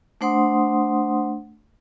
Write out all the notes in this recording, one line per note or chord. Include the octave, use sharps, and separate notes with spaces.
A3 D4 C5 F#5 C6 D#6